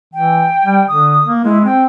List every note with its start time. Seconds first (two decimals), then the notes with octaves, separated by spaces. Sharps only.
0.14 E3 G5
0.66 G3
0.88 D3 D#6
1.26 A#3
1.45 G#3 E4
1.65 C4 G5